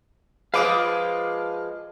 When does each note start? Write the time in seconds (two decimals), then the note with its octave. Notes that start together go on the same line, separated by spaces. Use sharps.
0.54 F3 G#3 B4 F5 D6 D#6